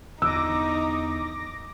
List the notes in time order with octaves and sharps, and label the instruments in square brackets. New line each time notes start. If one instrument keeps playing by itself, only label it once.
[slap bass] E2 D3 [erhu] D#4 [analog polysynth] D6 A#6 [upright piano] E6